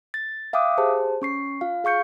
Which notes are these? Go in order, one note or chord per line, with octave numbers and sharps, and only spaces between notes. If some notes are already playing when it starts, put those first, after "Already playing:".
A6
E5 F5 G5 D6 D#6 F#6
G4 G#4 C5 A5
C#4 C#6 C7
F4 F5
G#4 F5 C#6 G6 C#7